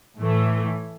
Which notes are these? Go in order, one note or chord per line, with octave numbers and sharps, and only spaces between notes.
A2 E3 A3